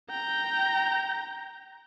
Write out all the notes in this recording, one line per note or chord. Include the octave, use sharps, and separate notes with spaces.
G5 A#5